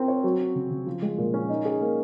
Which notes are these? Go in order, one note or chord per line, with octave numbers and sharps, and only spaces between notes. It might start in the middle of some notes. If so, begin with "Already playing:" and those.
Already playing: C4 F4 A#4
C#5
F#3
C#4
C#3
C#3
F3
G#3
A#2
C#4
D#4
G#4
A#3